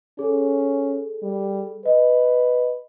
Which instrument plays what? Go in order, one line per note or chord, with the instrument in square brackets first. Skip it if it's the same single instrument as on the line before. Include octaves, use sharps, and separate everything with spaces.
[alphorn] C#4 [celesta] G#4 A4
[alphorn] G3
[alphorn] B4 [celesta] D#5